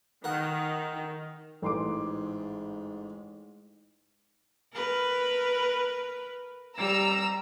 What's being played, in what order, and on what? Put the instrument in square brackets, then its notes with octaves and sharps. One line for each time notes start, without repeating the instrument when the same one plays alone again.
[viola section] D#3 [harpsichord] A#4 F#5
[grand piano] A1 C6 D6 [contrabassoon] G#2
[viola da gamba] A#4 B4
[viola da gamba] G3 [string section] A#5 E6